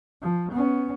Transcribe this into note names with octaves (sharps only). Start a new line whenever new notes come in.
F3
B3 C#4